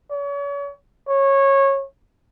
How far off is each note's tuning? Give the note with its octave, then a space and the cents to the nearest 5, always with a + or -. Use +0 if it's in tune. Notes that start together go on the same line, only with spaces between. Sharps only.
C#5 +40
C#5 -20